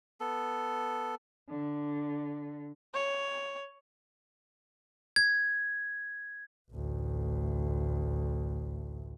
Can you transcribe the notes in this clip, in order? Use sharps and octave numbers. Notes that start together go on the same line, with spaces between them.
B3 A4
D3
C#5
G#6
A1 D2